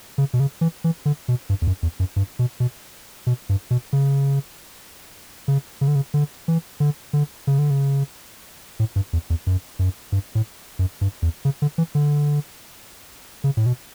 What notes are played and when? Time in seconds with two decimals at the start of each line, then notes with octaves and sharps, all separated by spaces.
0.18 C#3
0.33 B2
0.40 C#3
0.61 E3
0.84 E3
1.05 D3
1.28 B2
1.49 G2
1.62 E2
1.67 F#2
1.83 E2
2.00 F#2
2.16 G2
2.39 B2
2.60 B2
3.27 B2
3.49 G2
3.71 B2
3.93 C#3
5.48 C#3
5.81 C#3
5.88 D3
5.95 C#3
6.14 D3
6.48 E3
6.80 D3
7.13 D3
7.47 C#3
7.58 D3
7.70 C#3
8.80 A2
8.96 G2
9.13 E2
9.30 E2
9.47 F#2
9.79 F#2
10.12 G2
10.35 A2
10.79 F#2
11.01 G2
11.22 E2
11.45 C#3
11.62 D3
11.78 E3
11.95 D3
13.44 C#3
13.57 A2
13.66 B2